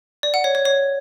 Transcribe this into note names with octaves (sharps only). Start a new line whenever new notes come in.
D5
F#5
C#5
C#5
C#5